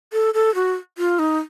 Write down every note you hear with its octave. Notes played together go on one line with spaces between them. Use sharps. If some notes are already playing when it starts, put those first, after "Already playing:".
A4
A4
F#4
F4
D#4